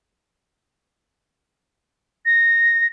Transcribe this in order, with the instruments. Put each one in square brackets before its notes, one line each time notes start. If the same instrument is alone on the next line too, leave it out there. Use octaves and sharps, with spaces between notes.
[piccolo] A#6